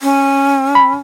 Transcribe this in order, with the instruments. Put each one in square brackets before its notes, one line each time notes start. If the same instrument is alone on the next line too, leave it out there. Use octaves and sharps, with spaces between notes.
[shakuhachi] C#4
[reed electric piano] B5